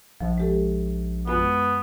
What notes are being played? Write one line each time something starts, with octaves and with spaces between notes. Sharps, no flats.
A#1 F3
G#3 G4 A4
F#2 G#3 B3 F4